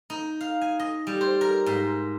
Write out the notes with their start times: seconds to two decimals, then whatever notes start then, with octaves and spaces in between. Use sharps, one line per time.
0.10 D#4
0.41 F5
0.61 G#5
0.79 D#5
1.07 G3
1.21 C5
1.41 A#4
1.66 G#2